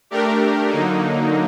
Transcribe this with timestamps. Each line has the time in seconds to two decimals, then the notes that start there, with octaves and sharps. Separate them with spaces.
0.10 A3 D4 G4 A#4
0.69 D3 F#3 A#3 D#4